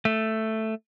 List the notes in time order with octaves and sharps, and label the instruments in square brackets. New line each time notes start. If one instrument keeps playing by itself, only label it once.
[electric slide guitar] A3